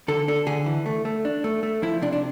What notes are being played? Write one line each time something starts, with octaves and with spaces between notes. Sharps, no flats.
D3 A4
D4 A4
D3 G#4
E3
A3
A3
D4
A3
A3
F3 E4
C3 D4
D4